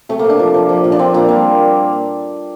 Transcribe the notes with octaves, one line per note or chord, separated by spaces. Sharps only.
C3 A3
C3 A#3
D4
F3
F3
F3
A#2
D4
F3 C4
A#2 A#3
G3 A#3